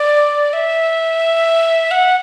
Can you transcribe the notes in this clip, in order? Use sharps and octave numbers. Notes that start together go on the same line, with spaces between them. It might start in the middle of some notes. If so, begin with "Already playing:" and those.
Already playing: D5
E5
F#5